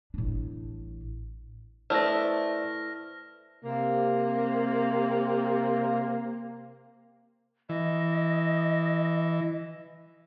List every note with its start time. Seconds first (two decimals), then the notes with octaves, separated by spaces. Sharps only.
0.14 A1 D4
1.90 A3 B3 E4 C5 D5 F6 A#6
3.64 C3 A#3
7.69 E3 D#5